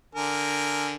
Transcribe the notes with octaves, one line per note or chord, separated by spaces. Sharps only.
D3 A#4 G#5